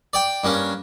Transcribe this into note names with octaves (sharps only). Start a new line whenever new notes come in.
D5 G5
G2 A#3 C#4